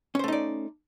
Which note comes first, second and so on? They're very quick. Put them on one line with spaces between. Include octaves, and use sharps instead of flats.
C#4 C5 A3 D#4 D5